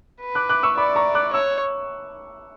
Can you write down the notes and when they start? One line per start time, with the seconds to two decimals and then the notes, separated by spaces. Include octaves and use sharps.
0.21 B4
0.35 D6 F#6
0.49 D6 F#6
0.63 C#6 E6
0.77 D5 B5 D6
0.96 A#5 C#6
1.15 D6 F#6
1.33 C#5 C#6 E6